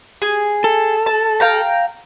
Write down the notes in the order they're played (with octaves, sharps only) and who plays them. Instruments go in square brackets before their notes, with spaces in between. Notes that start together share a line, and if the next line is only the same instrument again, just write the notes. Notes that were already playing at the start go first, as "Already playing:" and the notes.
[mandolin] G#4
[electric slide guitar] A4
[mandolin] A5
F5 G5 A#5